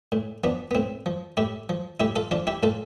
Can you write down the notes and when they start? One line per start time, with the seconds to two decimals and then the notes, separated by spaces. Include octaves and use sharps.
0.12 A2
0.44 F3 B3 D4
0.71 B3
0.75 A2 C4
1.06 F3
1.37 A2 E4 G4
1.69 F3
2.00 A2 E4 G4
2.16 F4 A4
2.31 F3 D4 F4
2.47 E4 G4
2.63 A2 F4 A4